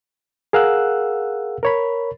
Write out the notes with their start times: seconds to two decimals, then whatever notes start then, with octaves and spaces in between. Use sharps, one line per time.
0.53 G#4 A#4 F5 F#5 E6 F#6
1.63 A#4 C#5 B5